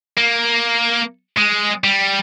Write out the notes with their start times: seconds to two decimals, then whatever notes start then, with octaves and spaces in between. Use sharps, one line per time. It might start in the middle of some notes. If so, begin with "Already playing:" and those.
0.17 A#3
1.37 G#3
1.84 G3